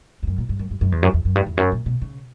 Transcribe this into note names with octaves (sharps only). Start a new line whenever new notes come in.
E2
F#2
A#2
G2
F#2
G2
F#2
E2
F#2
E2
F#2
G2
E2
F#2
A#2
B2
C#3